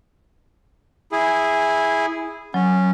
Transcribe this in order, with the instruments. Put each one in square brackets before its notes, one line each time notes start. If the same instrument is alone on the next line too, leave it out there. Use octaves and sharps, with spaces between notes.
[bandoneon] E4 G#4
[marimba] F#3 [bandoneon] C#4